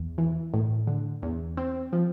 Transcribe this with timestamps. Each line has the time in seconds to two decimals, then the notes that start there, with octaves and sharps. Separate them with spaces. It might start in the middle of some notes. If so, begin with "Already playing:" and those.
Already playing: E2
0.18 E3
0.54 A2
0.87 D3
1.23 E2
1.57 C4
1.93 F3